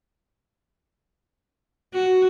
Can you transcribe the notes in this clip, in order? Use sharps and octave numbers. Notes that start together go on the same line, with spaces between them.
F#4